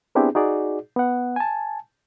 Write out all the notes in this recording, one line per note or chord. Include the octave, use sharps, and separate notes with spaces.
B3 C4 D4 E4 G4 G#4
D#4 F#4 G#4 D5
B3 F#5
G#5 A5